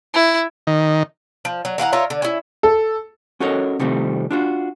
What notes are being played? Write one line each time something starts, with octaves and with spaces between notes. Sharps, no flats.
E4
D#3
F3
F#3
E3 F5 F#5 A#5
F4 A#4 C#5 E5
D3
C#4 E4
A4
C#4 F#4 A4 A#4 C#5 D#5
C3 D#3 F3 G3 A3 C4
D4 F4 F#4